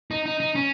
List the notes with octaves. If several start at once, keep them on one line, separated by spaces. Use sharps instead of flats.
D#4
D#4
D#4
C#4